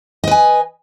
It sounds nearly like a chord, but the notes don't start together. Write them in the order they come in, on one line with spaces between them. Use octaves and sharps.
D#5 B4 G#5